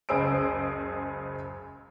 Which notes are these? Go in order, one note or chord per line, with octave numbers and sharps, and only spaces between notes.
F#1 C#2 G#4 C5 E6 D7